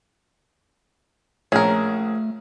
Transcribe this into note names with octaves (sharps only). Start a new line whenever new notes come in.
A#1 A3 C#4 G#4 A#4 C#5